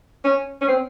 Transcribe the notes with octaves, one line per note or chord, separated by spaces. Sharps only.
C#4
C#4
C4